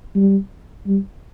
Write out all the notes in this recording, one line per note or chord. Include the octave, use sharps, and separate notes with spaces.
G3
G3